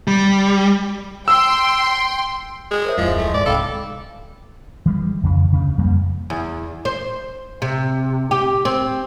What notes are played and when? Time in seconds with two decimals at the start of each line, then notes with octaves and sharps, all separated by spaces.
0.08 G3
1.28 G5 C6 E6
2.71 G#3
2.85 A#4 C5 C#5 E5
2.98 D1 F2 F3 G#3 E4 D#5
3.18 A3
3.34 G#2 D5
3.46 C2 G#2 A4 F5 G5 B5 D6
4.86 E3 G3 G#3
5.23 F2 C#3
5.52 D2 C#3
5.78 F2 G3 A#3
6.30 E2
6.85 C5
7.62 C3
8.31 G4
8.65 C4